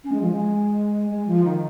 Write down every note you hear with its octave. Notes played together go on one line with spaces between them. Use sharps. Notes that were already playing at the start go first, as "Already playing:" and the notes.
C#4
G#3
F3
G#3
G#3
F3
D#3